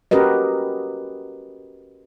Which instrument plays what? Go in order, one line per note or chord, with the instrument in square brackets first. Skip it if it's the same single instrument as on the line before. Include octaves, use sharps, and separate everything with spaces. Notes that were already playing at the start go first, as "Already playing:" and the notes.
[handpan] C#4 F#4 G4 A#4 B4 D#5